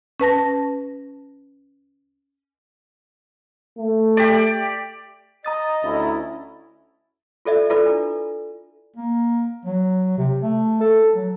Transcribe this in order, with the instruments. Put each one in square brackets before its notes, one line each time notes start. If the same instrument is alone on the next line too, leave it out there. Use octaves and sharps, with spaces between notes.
[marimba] C#4 B4 A5 A#6
[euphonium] A3
[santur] G4 D5
[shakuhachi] D#5 [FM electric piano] A#5 D#6 A6
[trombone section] D2 C#4 E4
[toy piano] F4 A4 D5 E5
E4 F4 A4 B4 D5
D4
[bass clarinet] A#3
F#3
C3
A3
A4
F#3